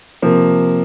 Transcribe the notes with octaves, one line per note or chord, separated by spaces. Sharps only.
C3 F3 A#3